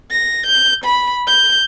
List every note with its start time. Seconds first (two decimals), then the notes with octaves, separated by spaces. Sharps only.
0.11 A#6
0.46 G6
0.84 B5
1.27 G6